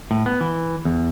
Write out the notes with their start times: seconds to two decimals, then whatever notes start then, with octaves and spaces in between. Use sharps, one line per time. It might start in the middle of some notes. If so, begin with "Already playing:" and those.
0.11 A2
0.26 B3
0.41 E3
0.85 E2